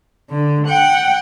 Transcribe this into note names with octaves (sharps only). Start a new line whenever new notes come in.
D3
F#5 G5